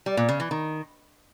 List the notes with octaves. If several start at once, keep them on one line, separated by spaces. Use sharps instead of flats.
G3
A#2
C#3
E3
D#3